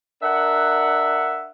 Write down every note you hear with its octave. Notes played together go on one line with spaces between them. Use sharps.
D4 A#4 E5 F#5